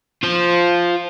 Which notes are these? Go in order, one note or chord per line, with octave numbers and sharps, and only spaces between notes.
F4 C5